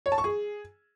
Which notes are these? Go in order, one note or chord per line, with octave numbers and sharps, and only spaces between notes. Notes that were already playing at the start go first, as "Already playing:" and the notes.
C#5
A5
C#6
G#4